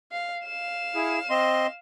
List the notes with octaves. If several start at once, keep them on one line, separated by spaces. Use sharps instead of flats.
F5
F5 E7
E4 G#4
C4 D#5 C6